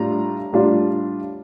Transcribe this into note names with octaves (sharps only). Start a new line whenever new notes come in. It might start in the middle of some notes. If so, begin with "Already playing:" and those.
Already playing: A2 G3 D4 F4 A#5
A2 G3 D4 F4